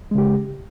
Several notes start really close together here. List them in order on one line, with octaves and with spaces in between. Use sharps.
G#3 C#3 G4